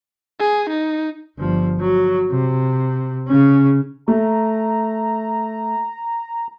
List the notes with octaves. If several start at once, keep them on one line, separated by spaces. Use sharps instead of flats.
G#4
D#4
G1 F3
F#3
C3
C#3 C#4
A3 A#5